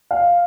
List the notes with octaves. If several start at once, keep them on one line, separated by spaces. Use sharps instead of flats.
F5